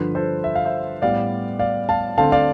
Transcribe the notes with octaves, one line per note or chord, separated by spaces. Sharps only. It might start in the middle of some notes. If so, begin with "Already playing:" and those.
Already playing: G2 D3 F3 B4
A4 C5
E5
F5
C5 E5
A2 G3 B3 D5 F5
D5 F5
F5 A5
D3 A3 C4 F5 A5
D5 F5